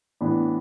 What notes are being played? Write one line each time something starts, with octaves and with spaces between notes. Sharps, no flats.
A2 E3 B3 D4